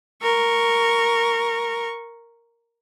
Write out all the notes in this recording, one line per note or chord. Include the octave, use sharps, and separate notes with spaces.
A#4 C#6